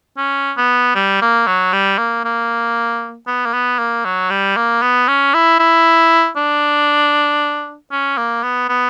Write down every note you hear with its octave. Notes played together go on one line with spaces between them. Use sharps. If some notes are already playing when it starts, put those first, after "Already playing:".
C#4
B3
G3
A#3
F#3
G3
A#3
A#3
B3
A#3
B3
A#3
F#3
G3
A#3
B3
C#4
E4
E4
D4
C#4
A#3
B3
B3